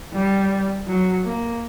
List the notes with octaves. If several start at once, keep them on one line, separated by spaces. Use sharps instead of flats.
G3
F#3
A#3